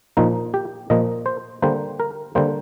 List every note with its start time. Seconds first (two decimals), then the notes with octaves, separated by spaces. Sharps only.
0.17 A#2 F3 A#3 D#4
0.54 G4
0.90 A#2 F3 A#3 D#5
1.26 C5
1.62 D3 G3 A#3 C5
2.00 A#4
2.35 D3 G3 A#3 C5